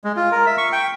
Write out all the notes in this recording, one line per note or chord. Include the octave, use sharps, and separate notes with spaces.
G#3
F4
A#4
E5
C#6
G5